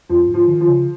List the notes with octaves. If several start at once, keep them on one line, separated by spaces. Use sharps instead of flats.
F2 F3
G#2
F3
D#3
F3
C#3